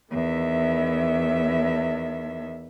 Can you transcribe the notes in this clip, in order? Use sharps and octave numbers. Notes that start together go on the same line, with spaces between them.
E2 D#3 E5